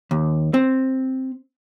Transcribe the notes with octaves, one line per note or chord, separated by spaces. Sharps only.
D#2
C4